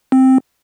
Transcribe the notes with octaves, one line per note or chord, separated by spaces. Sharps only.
C4